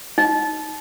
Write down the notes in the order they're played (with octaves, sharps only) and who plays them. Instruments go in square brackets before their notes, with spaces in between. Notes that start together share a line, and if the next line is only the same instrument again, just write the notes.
[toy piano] D#4